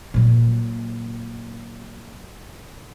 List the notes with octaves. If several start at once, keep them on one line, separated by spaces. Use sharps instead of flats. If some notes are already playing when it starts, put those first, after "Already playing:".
A#2 F#3